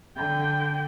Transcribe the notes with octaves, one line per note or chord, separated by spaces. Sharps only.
D3 G5